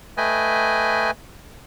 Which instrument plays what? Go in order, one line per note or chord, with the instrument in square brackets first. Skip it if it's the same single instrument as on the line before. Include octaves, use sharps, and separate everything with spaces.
[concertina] A3 B4 D#5 G5 G#5